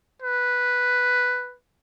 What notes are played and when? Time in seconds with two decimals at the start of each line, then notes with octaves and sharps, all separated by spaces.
0.22 B4